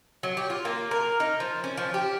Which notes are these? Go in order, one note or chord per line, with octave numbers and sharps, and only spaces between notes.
F#3
G4
F4
A#3
A#4
D#4
F3
C#4
F3
G4